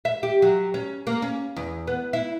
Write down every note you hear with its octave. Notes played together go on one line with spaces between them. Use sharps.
E5
G4
F#3
C#4
A#3
C#4
E2
B3
E4